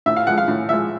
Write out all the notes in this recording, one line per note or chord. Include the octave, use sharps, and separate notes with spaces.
A2 E5
F5
F3 G#3 F#5
F5
A2
F3 G#3 E5